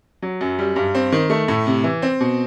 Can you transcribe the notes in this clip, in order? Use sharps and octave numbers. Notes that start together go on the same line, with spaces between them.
F#3
F#2
G3
G2
C4
D#3
A3
A2
C3
E3
C4
B2